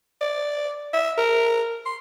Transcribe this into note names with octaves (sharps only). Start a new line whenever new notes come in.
D5
E5
A#4
C6